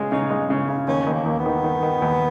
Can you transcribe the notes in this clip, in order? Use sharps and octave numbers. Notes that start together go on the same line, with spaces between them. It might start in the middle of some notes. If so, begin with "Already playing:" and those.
Already playing: C#3 G#3
C#3 D#4
G#3
C#3
C#3
D#2 C#4
D#2
A#3
D#2
B3
D#3
D#3
D#3
D#2